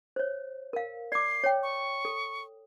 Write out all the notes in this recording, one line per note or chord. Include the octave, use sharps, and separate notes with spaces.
C5 C#5
A#4 F5
D5 D6 C7
C#5 G5
C#6
A4